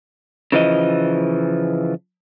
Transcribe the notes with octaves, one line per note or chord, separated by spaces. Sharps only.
C#3 E3 F3 D#5